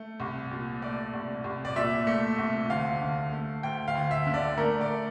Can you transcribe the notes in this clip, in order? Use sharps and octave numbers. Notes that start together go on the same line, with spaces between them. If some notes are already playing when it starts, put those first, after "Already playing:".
Already playing: A3
C2
A#2
A3 D5
C2
C2
D5
A#2 E5
A3
C2
D2 F5
D3
A3
D2 G5
F5
D2
E5
D3
D5
A3 A#4
D5